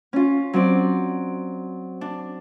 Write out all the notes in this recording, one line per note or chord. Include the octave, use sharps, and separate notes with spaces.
C#4 F4
F#3 C4 D5
D4